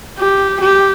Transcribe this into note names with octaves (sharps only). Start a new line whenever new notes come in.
G4
G4